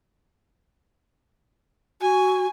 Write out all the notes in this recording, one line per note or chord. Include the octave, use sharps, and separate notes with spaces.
F#4 G#5